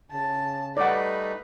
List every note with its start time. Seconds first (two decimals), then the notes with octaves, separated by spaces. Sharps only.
0.11 C#3 A5
0.77 G3 A3 D#4 B4 D5 F#5